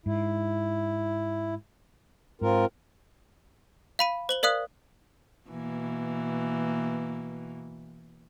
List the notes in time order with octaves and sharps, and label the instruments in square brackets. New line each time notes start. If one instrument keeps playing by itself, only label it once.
[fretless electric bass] G#2 [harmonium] E4
[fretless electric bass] G#2 [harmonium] C4 F4 A#4
[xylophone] F5 B5 D#7
C5 F#7 G7
A#4 D5 F5 D#6 F#6
[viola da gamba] B2 E3 A#3